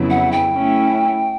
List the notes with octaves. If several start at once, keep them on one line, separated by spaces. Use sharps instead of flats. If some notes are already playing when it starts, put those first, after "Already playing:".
Already playing: F2 C#3 F#3 B3 E4
F#5
G5
A3 C#4 E4